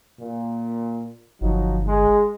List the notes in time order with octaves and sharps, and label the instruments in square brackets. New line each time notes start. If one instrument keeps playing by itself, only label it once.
[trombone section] A#2
[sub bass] G1 [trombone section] F3 F#3 D#4
[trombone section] G#3